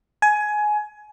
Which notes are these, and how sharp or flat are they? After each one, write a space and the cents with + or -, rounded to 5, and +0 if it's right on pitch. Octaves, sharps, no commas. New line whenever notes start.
G#5 +20